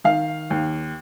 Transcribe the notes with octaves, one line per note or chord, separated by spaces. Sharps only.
D#3 F5
D#2